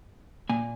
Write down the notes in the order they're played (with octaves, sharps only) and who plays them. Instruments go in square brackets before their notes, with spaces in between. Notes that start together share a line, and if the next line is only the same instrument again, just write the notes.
[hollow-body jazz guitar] A#2 A#3 G#5